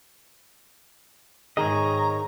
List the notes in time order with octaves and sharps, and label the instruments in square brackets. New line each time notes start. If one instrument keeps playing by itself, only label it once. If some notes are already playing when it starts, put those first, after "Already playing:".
[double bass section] G#2 [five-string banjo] D#3 G#4 [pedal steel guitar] C#5 D#5 [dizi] A#5